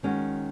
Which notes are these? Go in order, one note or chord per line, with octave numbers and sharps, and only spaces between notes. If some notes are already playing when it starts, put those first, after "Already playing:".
D#3 G#3 C#4 F#4